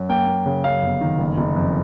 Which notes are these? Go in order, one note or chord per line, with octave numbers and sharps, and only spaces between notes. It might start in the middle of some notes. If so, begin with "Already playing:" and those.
Already playing: F#2
A#3 G5
A#3
C#3
F#2 F5
G1
D#3
F#1
F#1
F2